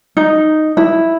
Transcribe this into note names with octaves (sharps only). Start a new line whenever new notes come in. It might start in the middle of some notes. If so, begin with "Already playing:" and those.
D#4
E4